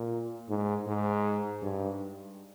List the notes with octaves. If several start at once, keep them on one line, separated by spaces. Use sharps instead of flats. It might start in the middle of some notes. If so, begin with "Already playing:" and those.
Already playing: A#2
G#2
G#2
G2